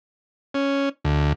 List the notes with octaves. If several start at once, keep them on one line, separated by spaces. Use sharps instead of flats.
C#4
D2